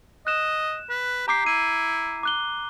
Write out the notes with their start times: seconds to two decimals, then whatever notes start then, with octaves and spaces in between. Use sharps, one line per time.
0.27 D#5 F#6 E7
0.90 B4
1.28 G4 A#5 D6 C7
1.46 E4 D#7
2.23 D6 F#6 G7